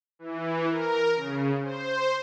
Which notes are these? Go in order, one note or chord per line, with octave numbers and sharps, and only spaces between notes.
E3
A#4
C#3
C5